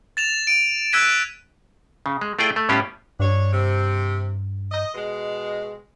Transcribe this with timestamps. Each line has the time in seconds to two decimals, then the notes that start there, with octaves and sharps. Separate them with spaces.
0.17 A6 E7 F7
0.47 D7 D#7
0.93 E6 F#6 G#6 B6 D#7 E7
2.06 C#3
2.21 G#3
2.39 A3 E4 F4 G#4 D5 G5
2.56 A3
2.69 A2 G3 B3 C#4 F4 G4
3.20 G2 D4 C#5
3.53 C3
4.72 D#5
4.94 B2 G#3